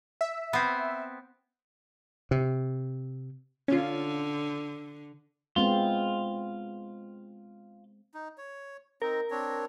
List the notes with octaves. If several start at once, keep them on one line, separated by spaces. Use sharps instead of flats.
E5
B3 C4
C3
D3 C#4 F4
G#3 B3 C4 F4
D#4
C#5
C4 D#4 A#4
C4 D4 C#5